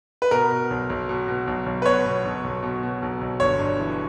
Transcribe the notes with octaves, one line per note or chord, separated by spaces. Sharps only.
B4
B2 A#4
B2
B1
B1
B2
B2
B1
B1
B4
B2 C#5
B2
B1
B1
B2
B2
B1
B1
G1 C#5
G2
E3